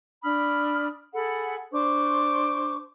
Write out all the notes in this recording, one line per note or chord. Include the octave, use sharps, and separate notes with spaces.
D4 B5 D#6 F6
G#4 A4 F#5 B5
D4 C5 C#6 D6